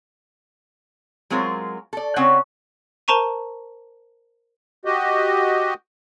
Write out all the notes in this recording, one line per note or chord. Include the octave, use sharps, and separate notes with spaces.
F#3 G#3 C4 F4 A#4
A4 D5
C#3 C4 C#4 F#5
A#4 C5 A5 A#5 C#6 D#7
F#4 G4 D#5